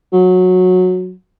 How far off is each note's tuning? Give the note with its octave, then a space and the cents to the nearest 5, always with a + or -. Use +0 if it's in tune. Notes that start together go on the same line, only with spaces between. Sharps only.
F#3 -15